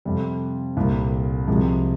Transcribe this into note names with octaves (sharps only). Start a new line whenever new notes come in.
F2 C3 G3
C2 A#2 G3
C2 C3 F3 G#3